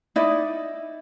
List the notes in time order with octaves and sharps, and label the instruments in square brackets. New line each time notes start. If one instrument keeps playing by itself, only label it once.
[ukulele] D#4 E4 D5 D#5